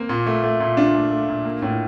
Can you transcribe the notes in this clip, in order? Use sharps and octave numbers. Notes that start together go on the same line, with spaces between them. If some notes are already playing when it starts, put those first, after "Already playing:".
Already playing: A#3 C4
A#2
A3
A3
A#2
A3 D4 F4
A3
A3
A#2
A#3
A2